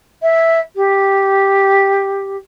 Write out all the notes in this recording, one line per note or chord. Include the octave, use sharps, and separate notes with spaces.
E5
G4